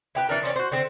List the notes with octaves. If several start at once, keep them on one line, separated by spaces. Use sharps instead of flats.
E4 G4 B4
E3 D4 A#4
D#3 C4 C#4 D5
F#4 C5
D3 C4